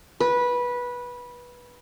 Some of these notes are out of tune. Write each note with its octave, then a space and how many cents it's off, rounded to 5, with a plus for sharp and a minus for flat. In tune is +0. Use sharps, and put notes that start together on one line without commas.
B4 -15